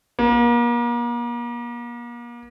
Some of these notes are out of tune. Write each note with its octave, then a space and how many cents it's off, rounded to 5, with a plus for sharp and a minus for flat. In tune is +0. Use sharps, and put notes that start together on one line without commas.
A#3 +40